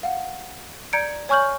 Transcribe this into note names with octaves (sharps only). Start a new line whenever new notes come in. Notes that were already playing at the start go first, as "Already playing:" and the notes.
F5 F#5
D5 A#5 G6 G#6 C#7 D7
C#5 G#5 C#6 F6 G6 F#7